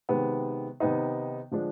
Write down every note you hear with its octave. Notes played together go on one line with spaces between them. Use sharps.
C3 D#3 G#3 B3
C3 D#3 B3 D#4
D3 F3 G#3 D4